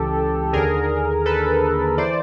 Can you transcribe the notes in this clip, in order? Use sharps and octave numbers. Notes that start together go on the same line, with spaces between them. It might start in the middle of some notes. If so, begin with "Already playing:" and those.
Already playing: C#2 C#3 E3 G4 A4
D#2 D3 G#4 A#4
A4 B4
E3 C5 D5